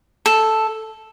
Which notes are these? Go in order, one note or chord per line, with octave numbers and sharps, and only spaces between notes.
A4